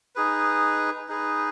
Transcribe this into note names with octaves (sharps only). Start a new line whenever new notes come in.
D#4 G#4 B4
D#4 G#4 B4